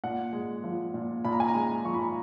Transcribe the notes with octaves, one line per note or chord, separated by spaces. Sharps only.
A#2 F#5
G#3
F3
A#2
A#2 B5
A#5
G#5
A#5
G#3
F3 C#6
B5
A#5